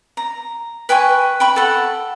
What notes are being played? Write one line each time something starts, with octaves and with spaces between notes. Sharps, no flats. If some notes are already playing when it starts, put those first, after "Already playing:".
A#5
B4 G5 G#5 C#6
G5 B5 C#6
A4 F#5